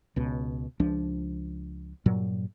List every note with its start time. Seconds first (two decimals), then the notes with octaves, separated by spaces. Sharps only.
0.16 C#2 B2
0.80 C#2 F3 D4
2.06 G2 A#2 F#3